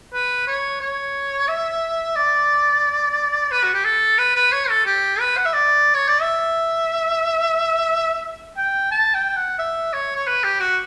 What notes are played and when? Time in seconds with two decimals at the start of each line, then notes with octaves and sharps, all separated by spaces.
0.14 B4
0.47 C#5
0.81 C#5
1.48 E5
2.16 D5
3.51 B4
3.63 F#4
3.74 G4
3.85 A4
4.18 B4
4.35 B4
4.53 C#5
4.69 A4
4.86 G4
5.20 B4
5.37 F#5
5.46 E5
5.53 D5
5.94 C#5
6.08 D5
6.21 E5
8.58 G5
8.91 A5
9.14 G5
9.36 F#5
9.59 E5
9.93 C#5
10.16 C#5
10.27 B4
10.44 G4
10.60 F#4